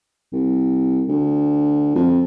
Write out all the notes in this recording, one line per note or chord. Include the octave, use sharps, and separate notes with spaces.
C2
D2
F2